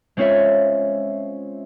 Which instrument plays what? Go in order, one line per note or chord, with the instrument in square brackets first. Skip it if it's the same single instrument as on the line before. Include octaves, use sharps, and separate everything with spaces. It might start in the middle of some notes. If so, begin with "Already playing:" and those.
[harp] G#3 C4 C#4 F4 C#5 E5